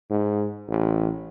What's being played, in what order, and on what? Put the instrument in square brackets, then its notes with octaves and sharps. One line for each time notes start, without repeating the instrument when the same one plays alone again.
[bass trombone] G#2
A1